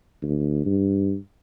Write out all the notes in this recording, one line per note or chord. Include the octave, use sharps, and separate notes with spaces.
D2
G2